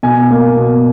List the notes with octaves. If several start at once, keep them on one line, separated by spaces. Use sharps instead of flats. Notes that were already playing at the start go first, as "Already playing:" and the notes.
B2 G#5
A#3
B2